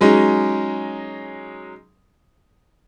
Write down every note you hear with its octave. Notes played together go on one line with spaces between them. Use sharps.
F#3 G#3 C#4 D#4